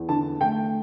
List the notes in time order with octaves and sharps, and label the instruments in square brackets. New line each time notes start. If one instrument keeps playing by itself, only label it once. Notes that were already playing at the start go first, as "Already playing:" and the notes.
Already playing: [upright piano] E2
D3 A5
A3 G5